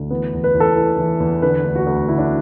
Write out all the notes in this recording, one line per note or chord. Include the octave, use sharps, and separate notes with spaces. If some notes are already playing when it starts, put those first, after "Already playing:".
Already playing: D2
E3 B3
E2
B4
E2
A4
E3
E3
E2
D3 B4
D2
F#4
D2
D3 E4
D4